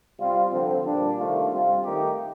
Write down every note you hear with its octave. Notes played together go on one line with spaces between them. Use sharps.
C3 G3 C4 F4
D3 F3 C4
A#2 G3 D4
C3 D#3 A3 D4 F4
G3 C4 F4
D#3 A3 D#4 G4